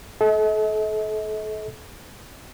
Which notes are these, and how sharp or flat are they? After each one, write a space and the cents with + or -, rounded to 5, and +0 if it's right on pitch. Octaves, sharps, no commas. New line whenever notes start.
A4 -35 D#5 +45